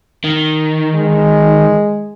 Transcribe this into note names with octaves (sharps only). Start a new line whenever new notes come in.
D#3
G#3